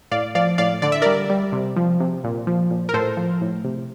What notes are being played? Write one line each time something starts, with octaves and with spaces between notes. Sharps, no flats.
A2 D5 F5
F3 D5 F5
A2 D5 F5
D3 D5
E5
G3 A#4 D5
G3
C3
F3
C3
A#2
F3
A#2
A#4
A2 A4 C5
F3
A2
C3